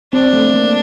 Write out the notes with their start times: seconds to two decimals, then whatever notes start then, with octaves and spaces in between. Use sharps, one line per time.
0.13 C4 D4
0.33 A3
0.54 A#3